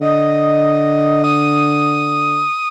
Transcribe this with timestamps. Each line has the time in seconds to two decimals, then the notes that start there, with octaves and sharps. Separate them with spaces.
0.01 D3 D#5
1.24 D#6